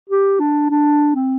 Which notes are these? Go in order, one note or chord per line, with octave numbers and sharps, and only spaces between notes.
G4
D4
D4
C4